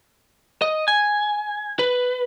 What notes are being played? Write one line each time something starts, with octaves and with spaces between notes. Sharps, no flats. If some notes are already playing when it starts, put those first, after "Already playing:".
D#5
G#5
B4